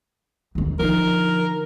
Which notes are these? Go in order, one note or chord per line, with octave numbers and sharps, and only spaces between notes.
A1 D#2
D3 F3 D#4 A#4